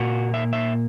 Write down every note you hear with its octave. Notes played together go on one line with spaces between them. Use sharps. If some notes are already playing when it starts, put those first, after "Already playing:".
Already playing: A#2 A#3 F#4
E5
E5